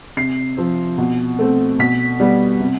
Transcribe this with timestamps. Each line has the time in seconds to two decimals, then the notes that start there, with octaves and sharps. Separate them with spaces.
0.17 C3 C7
0.57 F3 C4
0.98 B2
1.39 A3 C4
1.79 B2 B6
2.20 G3 B3
2.60 C3